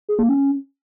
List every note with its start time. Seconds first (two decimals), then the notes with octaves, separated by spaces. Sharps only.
0.09 G#4
0.19 A#3
0.29 C#4